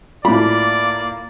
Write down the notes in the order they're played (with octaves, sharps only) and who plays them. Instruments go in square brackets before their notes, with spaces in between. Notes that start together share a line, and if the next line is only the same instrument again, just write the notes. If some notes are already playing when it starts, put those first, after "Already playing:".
[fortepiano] A2 F4 [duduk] A#3 [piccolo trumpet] D5 [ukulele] B5